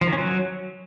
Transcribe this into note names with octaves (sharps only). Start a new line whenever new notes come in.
F3
D#3
C#4
F#3